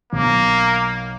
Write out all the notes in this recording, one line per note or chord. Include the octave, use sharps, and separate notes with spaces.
B1 A#3